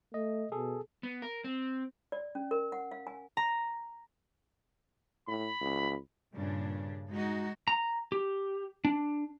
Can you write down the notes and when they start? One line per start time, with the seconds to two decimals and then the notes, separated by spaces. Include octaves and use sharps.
0.14 A3 D#5
0.52 B2 G#4 A4
1.03 B3
1.22 A#4
1.44 C4
2.12 D5
2.35 C#4
2.51 A#4
2.72 F#5
2.91 F5
3.07 G#5
3.37 A#5
5.28 A2 B5
5.61 C#2
6.34 G2 A#2 C#3 D4
7.09 G#3 D#4 F#4
7.68 A#5
8.12 G4
8.85 D4